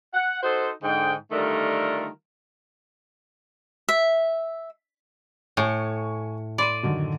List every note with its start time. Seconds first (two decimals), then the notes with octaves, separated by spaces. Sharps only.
0.14 F#5
0.43 D#4 F#4 A4 C5
0.83 G#2 D3 G5
1.31 D3 D#3 G3 A3 F4 A#4
3.89 E5
5.57 A2 G#5 C#6 C#7
6.58 D5 B5 C6 D#7
6.83 F#2 D3 D#3